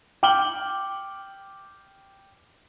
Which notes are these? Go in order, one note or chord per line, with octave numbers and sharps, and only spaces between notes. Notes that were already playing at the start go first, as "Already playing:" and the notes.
G5 D6 F6 F#7 G7